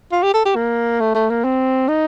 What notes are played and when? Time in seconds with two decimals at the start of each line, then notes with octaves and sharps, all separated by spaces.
0.12 F4
0.23 G4
0.34 A4
0.45 G4
0.56 A#3
1.00 A3
1.15 A3
1.30 A#3
1.44 C4
1.88 D#4